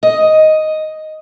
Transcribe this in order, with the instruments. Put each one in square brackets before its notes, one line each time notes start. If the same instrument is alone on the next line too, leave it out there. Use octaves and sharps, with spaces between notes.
[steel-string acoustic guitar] D#5